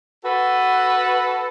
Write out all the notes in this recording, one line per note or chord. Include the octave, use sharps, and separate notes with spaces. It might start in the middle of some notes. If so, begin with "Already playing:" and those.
F#4 A4 B4